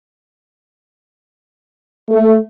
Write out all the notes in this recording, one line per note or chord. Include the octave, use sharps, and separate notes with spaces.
A3